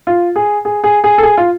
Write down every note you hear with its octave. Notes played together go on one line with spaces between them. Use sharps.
F4
G#4
G#4
G#4
G#4
A4
G#4
F4